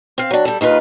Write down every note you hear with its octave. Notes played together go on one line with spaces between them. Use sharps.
C4 F5
F#3 D4
G3 A4
D#2 D#3 F4 B4